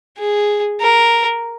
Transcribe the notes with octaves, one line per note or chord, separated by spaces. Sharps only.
G#4
A#4